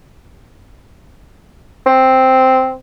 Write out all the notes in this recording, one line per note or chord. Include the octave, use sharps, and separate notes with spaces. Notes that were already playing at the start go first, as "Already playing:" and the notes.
C4